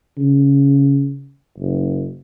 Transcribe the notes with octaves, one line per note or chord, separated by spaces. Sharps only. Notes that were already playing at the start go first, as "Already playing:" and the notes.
C#3
F#1